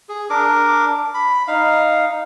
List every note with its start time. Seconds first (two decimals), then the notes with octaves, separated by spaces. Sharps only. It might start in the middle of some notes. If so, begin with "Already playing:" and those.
0.09 G#4
0.30 D4 A#4 D6
1.14 B5
1.48 D#4 F5